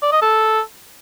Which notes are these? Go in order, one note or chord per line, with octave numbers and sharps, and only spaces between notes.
D5
D#5
A4